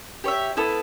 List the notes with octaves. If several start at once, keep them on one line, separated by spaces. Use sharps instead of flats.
G4 C#5 E5
B3 E4 A4